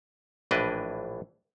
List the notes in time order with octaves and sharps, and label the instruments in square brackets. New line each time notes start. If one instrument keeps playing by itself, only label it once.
[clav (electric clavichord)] A#1 A2 E3 D4 B4 D#5